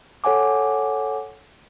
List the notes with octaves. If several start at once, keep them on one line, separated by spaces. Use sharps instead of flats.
A4 C#5 F#5 G#5 D6